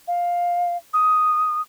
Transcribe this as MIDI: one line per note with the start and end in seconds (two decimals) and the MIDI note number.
0.08 0.77 77
0.93 1.62 87